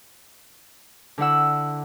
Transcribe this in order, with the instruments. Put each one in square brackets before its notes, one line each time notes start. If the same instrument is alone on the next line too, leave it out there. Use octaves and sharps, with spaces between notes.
[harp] D3 E4 F#5 E6